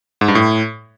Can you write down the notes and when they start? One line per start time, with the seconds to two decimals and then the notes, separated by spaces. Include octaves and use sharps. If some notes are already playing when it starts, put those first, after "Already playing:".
0.21 G#2
0.28 G2
0.35 A2